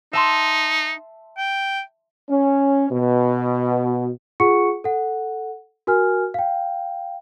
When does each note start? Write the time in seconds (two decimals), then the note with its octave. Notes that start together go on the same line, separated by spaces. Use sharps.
0.13 D#4 E5 A5 C6
1.38 G5
2.30 C#4
2.91 B2
4.40 F4 G#4 F#5 C#6 C#7
4.84 A4 F#5
5.87 F#4 A#4 G#5 F6
6.34 F5 G5